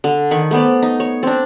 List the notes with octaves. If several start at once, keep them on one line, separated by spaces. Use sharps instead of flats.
D3
D#3 B5 C#6
A3 B3 C5 D5
D#4
C#5
C4 D4